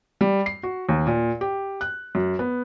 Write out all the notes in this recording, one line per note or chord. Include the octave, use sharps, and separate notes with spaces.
G3
C7
F#4
D#2
A#2
G4
F#6
F#2
B3